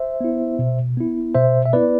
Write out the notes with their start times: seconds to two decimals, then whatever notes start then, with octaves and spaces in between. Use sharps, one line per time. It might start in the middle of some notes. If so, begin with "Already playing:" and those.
Already playing: C5 E5
0.21 B3 E4
0.59 B2
0.97 B3 E4
1.35 B2 C5 E5
1.65 E5
1.73 B3 E4 B4 D5